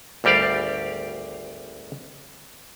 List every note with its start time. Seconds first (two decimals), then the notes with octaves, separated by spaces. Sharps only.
0.24 G#1 D2 G3 G4 D5 F5